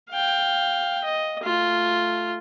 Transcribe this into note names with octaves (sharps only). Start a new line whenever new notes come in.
F5 G5
D#5
A3 F4